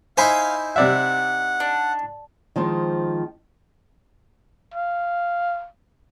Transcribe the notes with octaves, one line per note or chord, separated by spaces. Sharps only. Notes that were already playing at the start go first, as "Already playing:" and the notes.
D#4 E4 C5 F5 G#5 B5 C6
C3 D5 E5 F#5
D4
D#3 F3 G#3 C4
F5